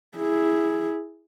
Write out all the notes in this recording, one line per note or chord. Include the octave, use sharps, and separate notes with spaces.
E4 G#4